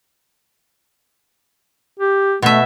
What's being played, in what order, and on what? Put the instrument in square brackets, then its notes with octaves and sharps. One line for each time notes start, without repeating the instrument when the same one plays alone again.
[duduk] G4
[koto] B2 E5 [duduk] A3